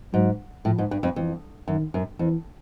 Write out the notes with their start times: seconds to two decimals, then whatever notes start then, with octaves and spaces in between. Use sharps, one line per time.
0.13 G#2 F#3
0.65 A2 F3
0.78 G#2
0.91 G2
1.03 F2
1.16 F2 E3
1.68 F#2 D#3
1.94 F#2
2.19 F2 E3